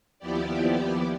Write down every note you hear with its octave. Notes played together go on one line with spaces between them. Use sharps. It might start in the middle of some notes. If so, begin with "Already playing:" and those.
D#2 F3 B3 E4 G4 D5